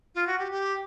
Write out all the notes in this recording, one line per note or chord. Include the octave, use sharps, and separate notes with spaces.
F4
F#4
G4
G4